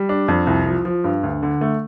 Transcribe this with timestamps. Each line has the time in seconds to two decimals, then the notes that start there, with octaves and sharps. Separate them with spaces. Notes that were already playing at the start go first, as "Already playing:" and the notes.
Already playing: G3
0.09 D4
0.28 F2
0.47 C2
0.66 F3
0.85 F3
1.04 G2
1.23 D2
1.43 D3
1.61 A3